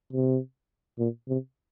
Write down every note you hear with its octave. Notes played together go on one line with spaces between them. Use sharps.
C3
A#2
C3